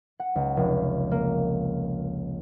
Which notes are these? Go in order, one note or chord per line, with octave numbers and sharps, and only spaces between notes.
F#5
C#2
F1
A#3